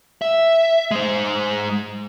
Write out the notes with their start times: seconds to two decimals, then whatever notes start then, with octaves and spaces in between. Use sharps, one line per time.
0.22 E5
0.91 G#3 C5